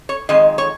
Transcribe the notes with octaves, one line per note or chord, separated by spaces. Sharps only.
C#5
F2 D#3 G#3 D#5
C#5